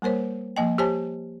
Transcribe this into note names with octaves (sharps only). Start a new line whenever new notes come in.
G3 A#3 A#4 C5 C#5
F3 A#3 D#5 G5
G4 C5 C#5 G#5 A5